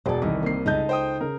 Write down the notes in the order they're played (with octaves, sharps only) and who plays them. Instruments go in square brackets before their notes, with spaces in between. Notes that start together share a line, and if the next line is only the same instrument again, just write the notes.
[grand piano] E1 B2 D5 [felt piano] G#4 [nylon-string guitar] A4 C5
[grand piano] C2 [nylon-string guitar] D#3 [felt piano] E3
[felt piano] A#3 C4 C7
[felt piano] C#2 D#5 G6 [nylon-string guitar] D#4 A4
[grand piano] C5 G5 D#6
[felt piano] C#3 [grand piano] A#4